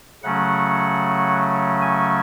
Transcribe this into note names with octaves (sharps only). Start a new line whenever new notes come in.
C#3 F#3 A3 C#4 F#5
G#5